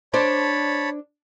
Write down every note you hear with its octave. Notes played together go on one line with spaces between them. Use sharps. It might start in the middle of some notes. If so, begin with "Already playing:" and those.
D4 C5 C#5 A5 B5